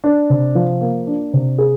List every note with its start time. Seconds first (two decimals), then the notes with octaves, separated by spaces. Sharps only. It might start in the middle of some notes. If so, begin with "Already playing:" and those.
0.04 D4
0.30 C3
0.55 F3
0.81 A#3
1.07 D4
1.33 C3
1.58 G#4